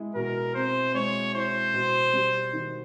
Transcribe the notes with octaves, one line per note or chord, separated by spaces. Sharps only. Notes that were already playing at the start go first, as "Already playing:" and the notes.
Already playing: G#3 E4
B2 A#4
C4 C5
G#3 C#5
E4 C5
B2
G3
D#3